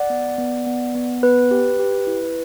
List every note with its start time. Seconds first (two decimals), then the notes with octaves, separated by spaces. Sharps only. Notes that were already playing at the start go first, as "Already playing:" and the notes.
Already playing: D5 F#5
0.10 B3
0.38 B3
0.66 B3
0.95 B3
1.23 B3 B4
1.51 G4
1.79 G4
2.07 E4